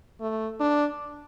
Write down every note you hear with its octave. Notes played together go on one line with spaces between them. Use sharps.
A3
D4